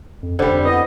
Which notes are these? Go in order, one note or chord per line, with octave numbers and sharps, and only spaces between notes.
F2
F1 D3 G3 C5
F2
B3 E4 D#5